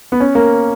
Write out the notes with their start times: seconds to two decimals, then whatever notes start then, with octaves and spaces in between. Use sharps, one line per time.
0.12 B3
0.20 C#4
0.35 A#3